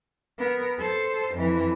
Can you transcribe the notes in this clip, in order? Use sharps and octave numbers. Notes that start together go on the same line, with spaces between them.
B3 A#4
A4 C5
F2 E3